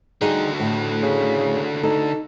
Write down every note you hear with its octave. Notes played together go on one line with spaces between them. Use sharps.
D3 G3 D#4 F#4 G#4
A2
C#3
D#4 A4